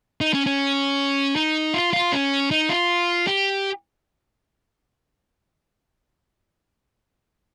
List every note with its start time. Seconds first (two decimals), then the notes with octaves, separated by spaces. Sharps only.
0.21 D#4
0.34 C#4
0.46 C#4
1.36 D#4
1.74 F4
1.93 F4
2.12 C#4
2.51 D#4
2.70 F4
3.27 G4